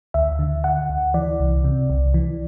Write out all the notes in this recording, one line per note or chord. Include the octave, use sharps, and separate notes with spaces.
D2 E5
D3
D3 F#5
D2
E3 D5
C2
C3
C2
E3